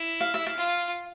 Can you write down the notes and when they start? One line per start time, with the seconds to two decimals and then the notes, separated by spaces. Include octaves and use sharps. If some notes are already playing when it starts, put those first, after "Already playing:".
Already playing: E4
0.21 F5
0.34 E5
0.47 F5
0.57 F4